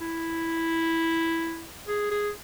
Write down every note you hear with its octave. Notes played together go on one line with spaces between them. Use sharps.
E4
G#4
G#4